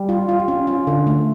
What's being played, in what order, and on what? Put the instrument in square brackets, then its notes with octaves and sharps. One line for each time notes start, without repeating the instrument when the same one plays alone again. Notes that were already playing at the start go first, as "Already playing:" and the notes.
Already playing: [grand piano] G3
[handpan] F4
F4
C#4
F4
D3
A3